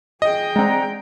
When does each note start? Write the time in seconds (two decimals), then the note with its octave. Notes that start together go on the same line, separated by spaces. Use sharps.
0.22 G#4 D#5 G5
0.56 G#3 C4 D4 F#5 A#5